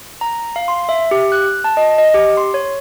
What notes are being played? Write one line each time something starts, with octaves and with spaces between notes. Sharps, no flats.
A#5
F5
C6
E5
G4
F#6
A5
D#5
D#5
G4
C6
C#5